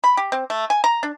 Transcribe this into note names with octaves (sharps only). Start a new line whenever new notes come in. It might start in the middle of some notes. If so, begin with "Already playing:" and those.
B5
G4
C4
A3
G#5
A#5
D4